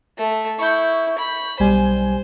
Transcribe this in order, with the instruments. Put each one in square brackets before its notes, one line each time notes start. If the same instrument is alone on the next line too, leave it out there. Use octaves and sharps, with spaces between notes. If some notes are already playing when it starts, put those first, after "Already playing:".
[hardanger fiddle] A3
[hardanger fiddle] E4 [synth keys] C#6 G6
[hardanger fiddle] B5
[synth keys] B1 G3 G#5 [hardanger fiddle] C5